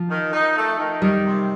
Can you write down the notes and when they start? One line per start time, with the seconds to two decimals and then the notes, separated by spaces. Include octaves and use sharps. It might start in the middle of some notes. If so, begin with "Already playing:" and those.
Already playing: F3
0.10 D#3
0.33 D#4
0.57 A3
0.79 D#3
1.02 D#3 G3
1.24 C3